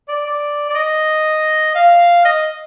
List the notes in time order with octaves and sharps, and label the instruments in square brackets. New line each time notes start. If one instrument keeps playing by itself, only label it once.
[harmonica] D5
D5
D5
D#5
F5
D#5